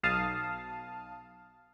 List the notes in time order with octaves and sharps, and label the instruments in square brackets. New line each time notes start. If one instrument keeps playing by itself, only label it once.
[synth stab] B1 F5 A5 D#6